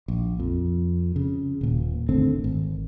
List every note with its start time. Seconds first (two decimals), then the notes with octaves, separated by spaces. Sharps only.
0.08 A#1
0.40 F2
1.16 C#3
1.61 D#1 A#2
2.09 G#1 D3 A3 C4
2.44 G#1